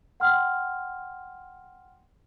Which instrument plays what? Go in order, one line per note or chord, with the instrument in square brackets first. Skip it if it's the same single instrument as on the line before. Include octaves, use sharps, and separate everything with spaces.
[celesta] F#5 G5 C6 F6